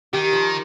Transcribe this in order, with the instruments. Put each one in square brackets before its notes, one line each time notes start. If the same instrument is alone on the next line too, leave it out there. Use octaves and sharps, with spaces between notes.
[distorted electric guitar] D#3 [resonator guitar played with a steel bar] G4
[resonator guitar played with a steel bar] F3